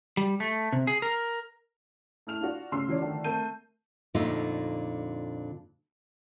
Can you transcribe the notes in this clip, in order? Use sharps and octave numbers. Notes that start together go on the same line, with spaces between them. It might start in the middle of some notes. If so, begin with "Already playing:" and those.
G3
A3
C3
G#4
A#4
A3 E4 F6 F7
D4 F4 F#4
D2 C#3 C6 E6 C7
E3 F#3 A3 C#4 C#5 D5
D3 D#3 F3 A3
A3 C4 A#4 A5 G6 D#7
F2 A#2 D3 A3 D#4 F4